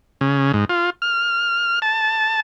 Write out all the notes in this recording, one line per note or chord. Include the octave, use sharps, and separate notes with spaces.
C#3
G#2
F4
F6
A5